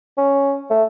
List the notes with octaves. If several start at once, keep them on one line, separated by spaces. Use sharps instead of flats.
C#4
A3